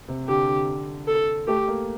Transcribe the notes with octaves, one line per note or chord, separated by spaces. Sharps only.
C3
D3 G4
D3
A4
A3 G4
A#3